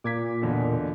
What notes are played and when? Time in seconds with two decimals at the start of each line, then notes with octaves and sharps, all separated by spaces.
0.04 A#2 D6 G#6 B6
0.42 E2 B2 D3